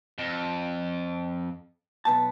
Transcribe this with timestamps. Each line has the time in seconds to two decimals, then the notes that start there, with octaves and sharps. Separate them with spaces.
0.18 F2
2.05 B1 B3 A5